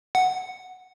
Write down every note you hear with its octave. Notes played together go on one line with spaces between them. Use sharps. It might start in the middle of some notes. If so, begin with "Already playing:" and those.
F#5